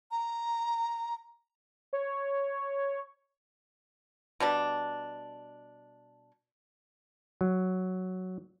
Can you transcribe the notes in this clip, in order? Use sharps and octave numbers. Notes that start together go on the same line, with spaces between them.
A#5
C#5
B2 G3 D4
F#3